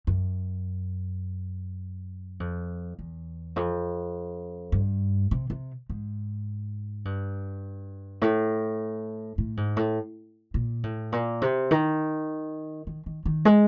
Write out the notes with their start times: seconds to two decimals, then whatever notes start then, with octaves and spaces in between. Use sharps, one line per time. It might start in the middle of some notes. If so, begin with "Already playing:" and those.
0.07 F#2
2.40 F2
2.99 E2
3.56 F2
4.72 G2
5.31 C3
5.50 C3
5.89 G#2
7.05 G2
8.22 A2
9.38 A2
9.57 G#2
9.76 A2
10.54 A#2
10.83 A2
11.12 A#2
11.42 C3
11.71 D#3
12.87 D#3
13.06 D#3
13.25 D#3
13.45 G#3